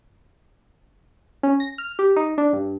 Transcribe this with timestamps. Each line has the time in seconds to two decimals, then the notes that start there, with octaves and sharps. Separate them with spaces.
1.43 C#4
1.60 A#6
1.78 F6
1.99 G4
2.16 D#4
2.38 D4
2.53 G2